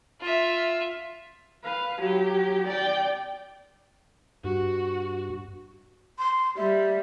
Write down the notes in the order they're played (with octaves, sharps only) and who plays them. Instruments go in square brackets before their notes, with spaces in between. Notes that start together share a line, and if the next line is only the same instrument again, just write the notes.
[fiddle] F4 E5
[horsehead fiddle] B4 F5
F#3 G4
D5 G5
[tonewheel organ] G2 [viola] F#4
[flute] C6
[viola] G3 [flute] E5